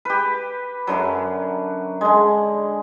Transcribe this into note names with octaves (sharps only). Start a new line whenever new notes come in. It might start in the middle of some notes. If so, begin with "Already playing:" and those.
G4 B4
F#2 D3 F#3
D3 G#3